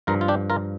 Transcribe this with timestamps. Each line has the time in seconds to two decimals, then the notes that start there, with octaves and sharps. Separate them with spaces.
0.07 G2 F3 F4 A#4
0.21 F4
0.28 D4 G4
0.50 F4 A#4